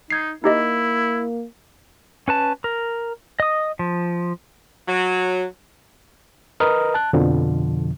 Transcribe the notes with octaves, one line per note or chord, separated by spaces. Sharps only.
D#4 G#6 C7
A#3 D#4 E4 G4 D#5
C#4 B4 A5
A#4
D#5 D#6
F3
F#3
A#4 B4 D#5 A#5 D#6 F6
A5 F#6
F2 B2 D3 F3